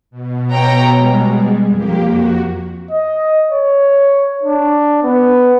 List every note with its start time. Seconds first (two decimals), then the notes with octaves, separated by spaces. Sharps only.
0.11 B2
0.51 C#5 G5 A#5
0.96 G3 G#3
1.74 F2 A#3 G4
2.06 F#4
2.91 D#5
3.52 C#5
4.43 D4
5.03 B3